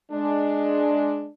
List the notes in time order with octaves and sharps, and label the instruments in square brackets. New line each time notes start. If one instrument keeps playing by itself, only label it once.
[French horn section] G#3 D4